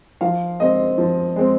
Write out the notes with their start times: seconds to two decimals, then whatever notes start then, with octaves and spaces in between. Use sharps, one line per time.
0.21 F3 F5
0.60 G#3 C4 D#5
0.98 F3
1.36 G#3 C4